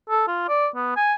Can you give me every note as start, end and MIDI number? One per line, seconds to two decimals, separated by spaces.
0.10 0.24 69
0.28 0.48 65
0.48 0.68 74
0.75 0.94 59
0.97 1.14 80